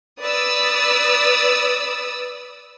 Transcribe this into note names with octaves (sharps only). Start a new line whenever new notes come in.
B4 D5 D#6 E6